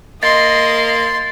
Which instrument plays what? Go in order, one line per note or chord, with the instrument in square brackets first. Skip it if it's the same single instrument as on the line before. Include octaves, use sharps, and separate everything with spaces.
[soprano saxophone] A#3 [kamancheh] D#5 [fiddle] C6 [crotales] A6